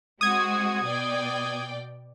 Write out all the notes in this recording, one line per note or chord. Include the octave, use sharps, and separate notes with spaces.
G#3 C4 F#4 D#6 G#6
B2 D5 G5